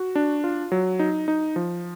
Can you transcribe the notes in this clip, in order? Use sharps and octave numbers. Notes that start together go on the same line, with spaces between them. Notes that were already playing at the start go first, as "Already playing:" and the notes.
Already playing: F#4
D4
F4
F#3
D#4
D#4
F3